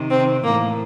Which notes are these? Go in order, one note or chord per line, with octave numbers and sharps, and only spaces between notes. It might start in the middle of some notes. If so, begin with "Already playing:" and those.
Already playing: C3 D#3
C4
A2 E3 A#3